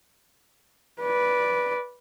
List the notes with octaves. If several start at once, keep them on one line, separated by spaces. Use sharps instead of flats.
B4 D5